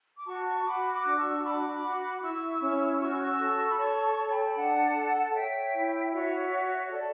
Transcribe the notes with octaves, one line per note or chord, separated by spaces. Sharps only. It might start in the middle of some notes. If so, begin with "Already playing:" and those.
D6
F#4 A5 C#6
F#4 B5 D6
D6 F#6
D4
C#6 E6
F#4 B5 D6
F#4
E4 C#6 E6
C#4
F#4 C#6 E6
A4
B5
C#5 A5 C#6
A5 C#6
A4
G5 B5
D4 F#5 A5
A4
C#5 E5 G5
E4
F#4 C#5 E5
F#4
A4 D5